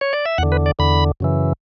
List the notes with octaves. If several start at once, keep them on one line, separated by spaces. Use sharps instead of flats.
C#5
D5
E5
E2 D3 F#5
B4
D5
E2 D3 B5
F#2 C#3 E3